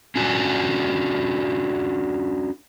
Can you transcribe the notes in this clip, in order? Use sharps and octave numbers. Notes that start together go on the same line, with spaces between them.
C#4 D4 F4 F#4 G#5